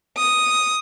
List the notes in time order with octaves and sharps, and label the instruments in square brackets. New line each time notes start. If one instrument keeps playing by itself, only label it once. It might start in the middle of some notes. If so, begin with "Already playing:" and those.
[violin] D#6